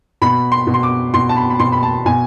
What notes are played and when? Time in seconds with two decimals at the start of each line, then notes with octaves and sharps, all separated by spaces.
0.22 B2 B5
0.52 C6
0.67 B2
0.74 C6
0.83 D6
1.14 B2 C6
1.29 A5
1.37 B5
1.50 B5
1.59 B2 C6
1.72 B5
1.83 A5
2.06 B2 G#5